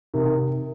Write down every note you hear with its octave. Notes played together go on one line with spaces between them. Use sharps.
C3 D#3